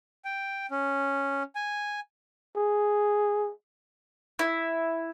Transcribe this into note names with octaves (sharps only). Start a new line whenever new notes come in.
G5
C#4
G#5
G#4
E4